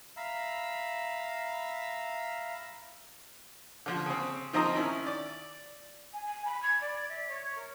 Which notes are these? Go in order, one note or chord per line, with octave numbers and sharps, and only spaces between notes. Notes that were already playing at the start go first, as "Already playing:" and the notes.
E5 F5 A#5 B5 E6
D3 F3
C#3 C4
D#3 F3 C4 D#5 A#5 D#6
D#3 C#4 E4
D5
G#5
G#5
B5
G#6
D5
E5
C#5
A#4